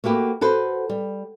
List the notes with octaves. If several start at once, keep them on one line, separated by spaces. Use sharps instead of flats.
A3 A#3 F#4 G4 B4
F#4 A4 B4 C5
G3